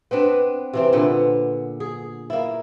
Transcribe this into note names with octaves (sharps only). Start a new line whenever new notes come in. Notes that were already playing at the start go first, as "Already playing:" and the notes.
B3 C4 D4 B4
C3 E3 C4
A#2 D3 B3
G#4
A#3 E4